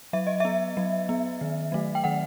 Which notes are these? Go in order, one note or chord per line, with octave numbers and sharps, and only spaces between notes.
F#3 E5
D#5
B3 E5
F#3
B3
D#3
F#3 A3
G5
D#3 F#5